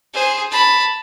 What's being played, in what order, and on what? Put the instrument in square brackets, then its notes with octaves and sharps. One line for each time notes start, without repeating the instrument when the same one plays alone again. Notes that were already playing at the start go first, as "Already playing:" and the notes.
[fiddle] G#4 C5
A5 B5